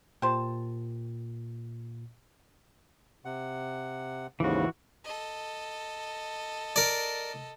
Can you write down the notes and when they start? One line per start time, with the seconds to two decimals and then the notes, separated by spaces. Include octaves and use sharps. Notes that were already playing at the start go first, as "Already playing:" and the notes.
0.22 A#2 G4 C5 A5
3.25 C3 F#5
4.40 D#2 G#2 C#3 E3 F#4
5.04 A4 D#5
6.76 A#4 D5